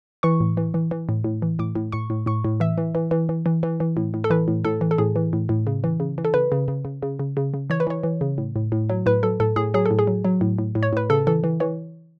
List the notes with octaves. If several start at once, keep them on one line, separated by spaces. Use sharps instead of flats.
E3 C#6
A2
E3
E3
E3
A2
A2
E3
A2 D6
A2
A2 C#6
A2
A2 C#6
A2
E3 E5
E3
E3
E3
E3
E3
E3
E3
A2
A2
A4
E3 B4
A2
A2 A4
E3
A4
A2 G#4
E3
A2
A2
C#3
E3
C#3
E3
A4
C#3 B4
C#3
C#3
C#3
C#3
C#3
C#3
C#3
E3 C#5
B4
E3 C#5
E3
C#3
A2
A2
A2
F#3
A2 B4
F#3 A4
A2 A4
A2 G#4
F#3 G#4
A4
A2
G#4
F#3
F#3
A2
A2
A2
C#5
A2 B4
C#3 A4
E3 A4
E3
E3 C#5